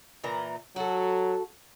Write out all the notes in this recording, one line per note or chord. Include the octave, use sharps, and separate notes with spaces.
A#2 E3 A#5
F#3 F#4 A4